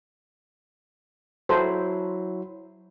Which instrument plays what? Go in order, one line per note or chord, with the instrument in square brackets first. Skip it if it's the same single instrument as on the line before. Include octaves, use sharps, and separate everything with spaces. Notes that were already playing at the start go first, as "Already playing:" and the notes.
[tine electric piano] F#3 E4 [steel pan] A4 C5